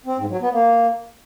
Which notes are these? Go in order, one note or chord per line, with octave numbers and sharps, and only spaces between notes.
C4
G#2
F#3
B3
A#3